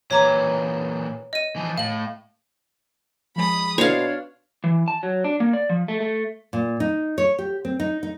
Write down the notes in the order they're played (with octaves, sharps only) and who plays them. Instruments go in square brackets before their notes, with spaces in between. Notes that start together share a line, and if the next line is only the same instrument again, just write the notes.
[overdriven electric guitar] A#2 E3 [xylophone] C#5 A#5 D6
[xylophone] D#5 D#7
[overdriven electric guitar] E3 F3
[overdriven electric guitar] A2 [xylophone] F5 F#7
[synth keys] F3 G#3 [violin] B5 D#6
[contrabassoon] B2 [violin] D4 [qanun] C#5 F5 [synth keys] C6 G#6 C7
[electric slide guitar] E3
A5
F#3
D4
A#3
D5
F3
A3
A3
[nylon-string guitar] A#2
D#4
C#5
G4
C4
D#4
D#4